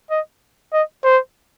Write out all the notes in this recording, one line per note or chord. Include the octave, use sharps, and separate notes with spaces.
D#5
D#5
C5